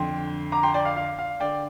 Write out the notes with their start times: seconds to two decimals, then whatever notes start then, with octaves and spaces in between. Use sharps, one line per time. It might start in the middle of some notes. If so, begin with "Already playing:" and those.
Already playing: F2 D3 G5 C6
0.52 A#5 D6
0.63 G5 C6
0.74 D5 G5
0.85 F5
0.96 F5
1.19 F5
1.40 D3 D5 G5